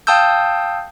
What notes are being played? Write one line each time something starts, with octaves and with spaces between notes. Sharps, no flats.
F5 G5 A5 D#6 E6 G6